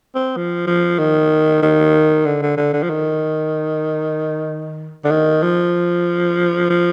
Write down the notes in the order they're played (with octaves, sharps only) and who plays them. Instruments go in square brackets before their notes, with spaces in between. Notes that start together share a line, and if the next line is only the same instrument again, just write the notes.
[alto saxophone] C4
F3
F3
D#3
D#3
D3
D3
D3
D3
F3
D#3
D3
D#3
F3
F3